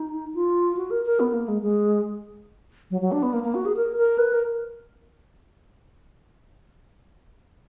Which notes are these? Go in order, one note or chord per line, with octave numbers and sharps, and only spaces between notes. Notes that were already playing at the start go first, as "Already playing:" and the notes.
Already playing: D#4
F4
F#4
A#4
A#4
B3
A#3
G#3
G#3
F#3
F#3
D4
B3
A#3
A#3
F#4
G#4
A#4
A#4
B4
A#4